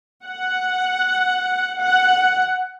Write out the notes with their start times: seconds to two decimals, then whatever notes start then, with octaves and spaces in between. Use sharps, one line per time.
0.24 F#5
1.79 F#5